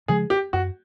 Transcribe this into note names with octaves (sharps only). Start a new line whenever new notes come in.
C#3 F3 G#3 G#4
G4
F#2 F#4